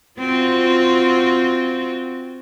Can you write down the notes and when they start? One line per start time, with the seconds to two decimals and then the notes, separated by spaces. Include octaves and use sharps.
0.20 C4 F4 F#4